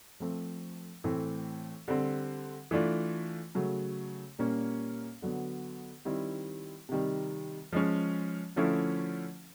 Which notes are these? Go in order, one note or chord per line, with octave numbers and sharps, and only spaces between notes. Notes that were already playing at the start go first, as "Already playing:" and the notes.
F3 A3 C4
A2 E3 A3 C4
D3 G3 C4
E3 A3 D4 F4
C#3 F#3 A3
A#2 G3 A#3 C#4
D3 F#3 B3
D#3 G3 C4 E4
C3 D#3 G3
F3 G#3 C#4
D3 F3 A3 C#4 E4